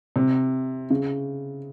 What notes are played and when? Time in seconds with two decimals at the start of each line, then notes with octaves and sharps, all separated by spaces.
0.16 C3
0.90 C#3